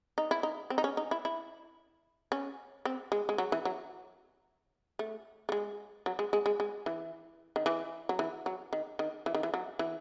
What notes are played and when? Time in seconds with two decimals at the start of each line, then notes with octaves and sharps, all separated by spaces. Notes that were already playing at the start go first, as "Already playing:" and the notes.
0.18 D#4
0.31 E4
0.43 D#4
0.70 C4
0.78 D#4
0.84 C#4
0.97 D#4
1.11 E4
1.25 E4
2.32 C#4
2.85 C4
3.12 G#3
3.29 G#3
3.38 F#3
3.52 E3
3.65 F#3
4.99 A3
5.49 A3
5.52 G#3
6.06 F#3
6.19 G#3
6.33 G#3
6.46 G#3
6.60 G#3
6.86 E3
7.56 D#3
7.66 E3
8.09 F#3
8.19 E3
8.46 F#3
8.73 D#3
8.99 D#3
9.26 E3
9.34 D#3
9.43 E3
9.54 F#3
9.79 E3